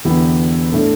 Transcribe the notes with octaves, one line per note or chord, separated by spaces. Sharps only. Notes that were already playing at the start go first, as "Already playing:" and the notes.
E2 D3 B3 E4 G4
A2 A3 D4 A4